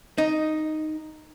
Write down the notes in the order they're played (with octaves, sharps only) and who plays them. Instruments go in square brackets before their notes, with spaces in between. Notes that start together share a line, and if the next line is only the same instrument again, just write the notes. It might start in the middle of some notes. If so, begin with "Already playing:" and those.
[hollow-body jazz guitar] D#4